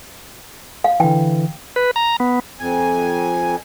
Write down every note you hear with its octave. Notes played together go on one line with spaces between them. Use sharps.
F5
D3 E3 G5
B4
A#5
B3
F2 G#5